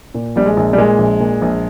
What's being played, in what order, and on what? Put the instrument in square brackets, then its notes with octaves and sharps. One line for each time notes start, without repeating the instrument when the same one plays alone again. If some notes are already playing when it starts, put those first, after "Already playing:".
[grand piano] A#2
A#1 G3
G#3
A#1
G3
A#2 G#3
A#1
A#2
A#1